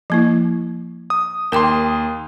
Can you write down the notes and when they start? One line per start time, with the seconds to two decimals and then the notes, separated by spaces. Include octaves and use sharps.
0.10 F3 A#3 E4
1.10 D#6
1.52 D#2 A#4 G5 C6 D6